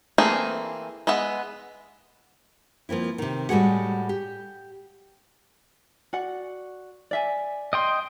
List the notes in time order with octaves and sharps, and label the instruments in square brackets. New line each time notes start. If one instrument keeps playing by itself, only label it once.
[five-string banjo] E3 A3 A#3 C4 G#4
G#3 B3 E5 F#5
[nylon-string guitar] F3 A#3 C4 E4
C3 D#3
A2 G3 G#3 F#4 G#4 F#5
G4
[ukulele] F#4 D5 F#5
D5 E5 G#5
[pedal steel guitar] D#5 G5 C6